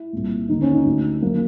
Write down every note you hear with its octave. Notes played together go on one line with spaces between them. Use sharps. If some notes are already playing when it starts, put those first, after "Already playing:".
Already playing: E4
C2 A#2
D#2 D3 D#4
C#4
D#4
D2 D3
F#2 D#3 A#3